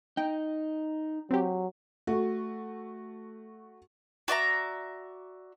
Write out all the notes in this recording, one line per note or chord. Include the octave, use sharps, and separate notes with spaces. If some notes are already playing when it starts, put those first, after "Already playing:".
D#4 G5
F#3 C4 G4
A3 F#4
F#4 D5 E5 A#5